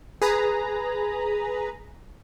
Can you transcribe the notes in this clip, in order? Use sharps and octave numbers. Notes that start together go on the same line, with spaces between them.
G#4 B4 A#5